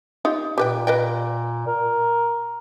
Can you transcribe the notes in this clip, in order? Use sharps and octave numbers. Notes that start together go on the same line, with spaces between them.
D#4 F4 G4
A#2 G4 B4 G5
B4 D#5 G5
A#4